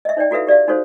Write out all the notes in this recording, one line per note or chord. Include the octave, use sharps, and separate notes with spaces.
D#5 E5
D#4 C#5 D5 G5
E4 F#4 A4 B4 E5 F5
G4 D5 E5 F5
D#4 F#4 A4 C5 C#5 F5